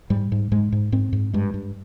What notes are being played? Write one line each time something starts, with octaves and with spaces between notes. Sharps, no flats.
G#2 G3
G#2
G#2 G#3
G#2
G#2 C4
G#2
G2 G#3
G2